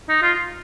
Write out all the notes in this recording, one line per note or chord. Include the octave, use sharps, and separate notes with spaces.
D#4
F4